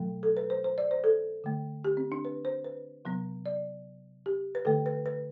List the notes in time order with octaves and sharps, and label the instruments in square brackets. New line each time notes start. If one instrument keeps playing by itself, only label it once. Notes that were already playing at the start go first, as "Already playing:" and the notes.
Already playing: [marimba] B2 F#3 A3
A4
B4
C5
C5
D5
C5
A4
D3 A3
G4
C4
D4
B4
C5
B4
C3 F#3 B3
D5
G4
B4
D3 A3 A4
B4
B4